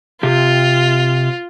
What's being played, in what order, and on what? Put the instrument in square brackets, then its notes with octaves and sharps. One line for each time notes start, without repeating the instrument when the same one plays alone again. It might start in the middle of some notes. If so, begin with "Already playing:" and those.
[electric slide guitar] C3 G4 [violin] F4